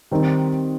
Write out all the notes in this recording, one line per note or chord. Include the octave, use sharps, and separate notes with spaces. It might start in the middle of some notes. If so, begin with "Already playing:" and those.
D#3 G3 C4 D#4